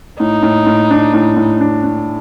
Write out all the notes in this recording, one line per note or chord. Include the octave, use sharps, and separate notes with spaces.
A2 D#4
A2
A2
D4
A2
A2
D4
D4